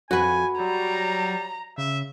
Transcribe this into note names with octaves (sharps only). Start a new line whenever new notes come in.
F2 F#4 B4 G#5
F#3 G3 A#5
C#3 E5